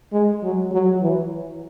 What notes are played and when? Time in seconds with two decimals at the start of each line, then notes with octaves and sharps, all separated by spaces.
0.13 G#3
0.43 F#3
0.72 F#3
1.01 E3